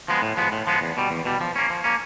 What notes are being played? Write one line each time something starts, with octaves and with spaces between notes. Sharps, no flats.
F3 G#3 B3
A2
F3 G#3 B3
A2
F3 G#3 B3
E2
B2 G3
E2
B2 G3
F3
A#3 C#4
F3
A#3 C#4